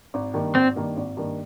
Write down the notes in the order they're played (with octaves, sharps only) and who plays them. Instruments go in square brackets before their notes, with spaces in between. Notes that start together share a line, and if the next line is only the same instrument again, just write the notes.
[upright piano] G#1
G2 D#3 A#3
[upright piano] G#1 [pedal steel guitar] C4
[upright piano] G2 D#3 A#3
G#1
G2 D#3 A#3